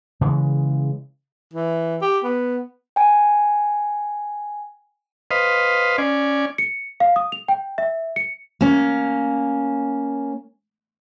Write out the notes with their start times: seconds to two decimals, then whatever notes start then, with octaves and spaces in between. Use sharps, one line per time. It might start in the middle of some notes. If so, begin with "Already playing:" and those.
0.21 C#3 E3 G#3
1.53 E3
2.01 G4
2.24 B3
2.96 G5 G#5
5.31 B4 C5 D#5 F5
5.98 C#4 D5 G#5
6.58 C#7
7.00 F5
7.16 D#6
7.32 F7
7.48 G5
7.78 E5
8.16 C#7
8.61 A#3 C#4